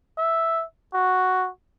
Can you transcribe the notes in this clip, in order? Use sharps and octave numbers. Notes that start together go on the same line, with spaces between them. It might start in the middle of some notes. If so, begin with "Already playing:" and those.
E5
F#4